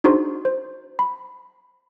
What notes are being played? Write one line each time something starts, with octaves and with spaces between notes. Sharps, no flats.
D4 D#4 F#4 G#4 C5 C6
C5
B5